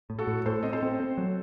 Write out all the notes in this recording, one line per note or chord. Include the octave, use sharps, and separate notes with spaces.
A2
F#4 A4
A2
A2 A4 C5
C4 D#5
A4 C5
C4
C4
F#3